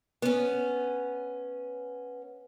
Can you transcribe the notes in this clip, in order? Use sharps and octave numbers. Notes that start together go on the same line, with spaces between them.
B3 C#4